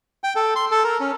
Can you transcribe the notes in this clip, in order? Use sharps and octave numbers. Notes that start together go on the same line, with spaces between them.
G5
A4
C6
A4
A#4
C#4